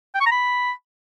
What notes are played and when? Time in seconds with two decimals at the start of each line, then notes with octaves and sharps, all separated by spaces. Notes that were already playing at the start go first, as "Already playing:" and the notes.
0.15 G5
0.20 C#6
0.26 A#5
0.32 B5